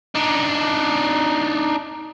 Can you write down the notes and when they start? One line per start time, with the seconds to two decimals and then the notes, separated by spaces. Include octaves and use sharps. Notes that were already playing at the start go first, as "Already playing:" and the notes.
0.15 D4 D#4